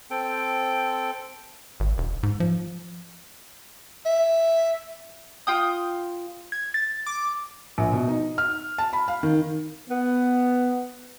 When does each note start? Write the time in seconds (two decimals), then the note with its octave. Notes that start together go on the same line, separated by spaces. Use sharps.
0.10 C4 A4 G5
1.80 G#1
1.98 E1
2.23 G#2
2.40 F3
4.06 E5
5.47 F4 G5 D#6
6.52 G#6
6.74 A6
7.07 D6
7.78 A#1
7.93 B2
8.08 D#4
8.38 F6
8.78 A5
8.93 B5
9.08 F5
9.23 D#3
9.89 B3